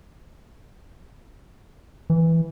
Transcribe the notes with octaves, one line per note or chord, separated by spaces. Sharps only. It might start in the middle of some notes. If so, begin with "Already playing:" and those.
E3